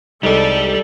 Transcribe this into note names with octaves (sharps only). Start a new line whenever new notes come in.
C2 G3 G#3 D#4 A4 D5